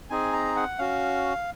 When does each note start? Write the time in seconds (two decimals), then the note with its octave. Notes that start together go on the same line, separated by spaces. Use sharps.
0.10 C4 D#4 G#4 G#5
0.33 A#5
0.56 F#5
0.78 C#4 F#4 F5